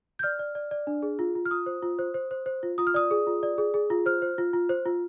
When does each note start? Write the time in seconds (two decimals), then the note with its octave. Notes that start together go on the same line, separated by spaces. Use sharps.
0.19 G6
0.23 D5 F6
0.39 D5
0.55 D5
0.71 D5
0.87 D4
1.03 G#4
1.19 F4
1.35 F4
1.46 F6
1.51 F4 D#6
1.66 C5
1.83 F4
1.99 C5
2.14 C5
2.31 C5
2.46 C5
2.63 F4
2.78 F4 D#6
2.87 F6
2.94 D5 D#6
3.11 G#4
3.27 F4
3.43 D5
3.58 G#4
3.74 G#4
3.90 F4
4.06 C5 F6
4.22 C5
4.38 F4
4.53 F4
4.69 C5
4.86 F4